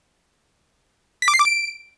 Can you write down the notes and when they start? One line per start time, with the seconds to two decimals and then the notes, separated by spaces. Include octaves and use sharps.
1.22 B6
1.28 D6
1.34 C7
1.39 D6
1.45 D7